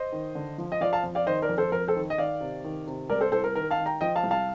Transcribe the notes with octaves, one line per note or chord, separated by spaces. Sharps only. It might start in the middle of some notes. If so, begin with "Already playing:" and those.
Already playing: C5 D#5
D#3
D3
F3
D#5
F3 D5 F5
F5 A5
F2
D5 F5
D#3 C5 D#5
A#4 D5
F2
A4 C5
F2 A#4
A4 C5
D#3
D#5
D#3 D5 F5
C3
D#3
C3
G3 A#4 D5
A4 C5
C2 A4 C5
A#4
D#3 A#4
F5 A5
D#3
G5 A#5
F3 D#5 G5
F5 A5
C2
F5 A5